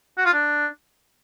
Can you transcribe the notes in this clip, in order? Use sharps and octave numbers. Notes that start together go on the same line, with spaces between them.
F#4
F4
D4